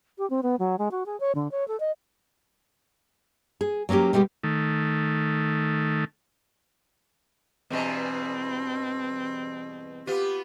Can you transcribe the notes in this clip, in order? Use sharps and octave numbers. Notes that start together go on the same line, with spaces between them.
G4
C4
B3
F#3
G#3
F#4
G#4
C#5
D3
C#5
A4
D#5
G#4
F#3 A#3 C4 C#4 G4
B2 G3 G#3 F#4 G4
D#3 A3
E2 G2 B2 C4
B3 F4 G4